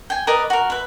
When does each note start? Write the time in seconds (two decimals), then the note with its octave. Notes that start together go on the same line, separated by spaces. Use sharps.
0.10 G5 G#5
0.27 A#4 B4 D5 D#5
0.50 F#4 A#4
0.70 B4 E5